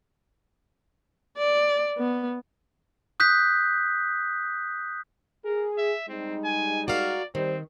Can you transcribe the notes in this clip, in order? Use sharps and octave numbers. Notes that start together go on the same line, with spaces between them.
D5
B3
D#6 F#6 G6 B6
G#4 A#4
E5
G3 G#3 C4 D#4
G#5
F#4 A#4 D5 F5
D#3 G3 C4 C5